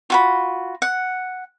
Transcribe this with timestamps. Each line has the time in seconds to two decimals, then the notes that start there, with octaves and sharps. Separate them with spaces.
0.10 F4 F#4 B5
0.82 F#5